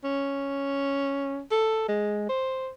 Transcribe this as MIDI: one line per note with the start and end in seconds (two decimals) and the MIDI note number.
0.04 1.41 61
1.51 1.87 69
1.88 2.28 56
2.29 2.70 72